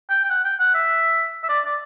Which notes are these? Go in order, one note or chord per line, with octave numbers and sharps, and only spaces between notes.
G5
G5
F#5
G5
F#5
E5
E5
D5
D5